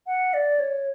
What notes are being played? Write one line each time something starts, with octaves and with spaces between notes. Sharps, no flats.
F#5
D5
C#5